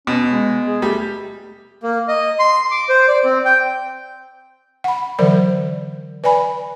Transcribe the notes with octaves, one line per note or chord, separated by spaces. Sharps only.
B2 C#4
G#3
G#4
G3 A3
A#3
D#5
C6
D6
C5
D5
C4
G5
F#5 B5
D3 E3 F#3 A#4 C5 D5
B4 D5 G#5 B5